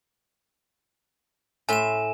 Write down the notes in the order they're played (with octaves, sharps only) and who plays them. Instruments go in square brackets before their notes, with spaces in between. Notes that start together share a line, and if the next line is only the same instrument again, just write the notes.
[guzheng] A2 E5 C6 [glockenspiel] G#5 E7